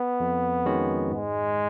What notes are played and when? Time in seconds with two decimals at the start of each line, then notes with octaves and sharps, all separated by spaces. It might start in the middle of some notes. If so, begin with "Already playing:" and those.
Already playing: B3
0.20 F2
0.66 D#3 G#3 C#4 F#4
1.11 G#2 G#3